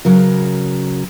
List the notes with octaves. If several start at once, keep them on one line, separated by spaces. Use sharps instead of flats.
C#3 F#3 A#4